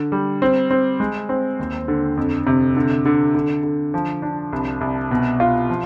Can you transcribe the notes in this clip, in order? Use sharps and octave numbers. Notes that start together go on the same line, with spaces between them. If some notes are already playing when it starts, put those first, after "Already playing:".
Already playing: D3
G3
C4
C4
G#3
C4
D#2
D3
F2
C3
D3
D3
D3
D3
F3
D4
C2
C2
B2
F4
F3